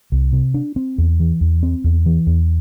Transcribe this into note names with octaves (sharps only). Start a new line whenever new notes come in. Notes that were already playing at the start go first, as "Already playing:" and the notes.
C2
C3
D4
C4
E2
E3
E2
C4
E2
E3
E2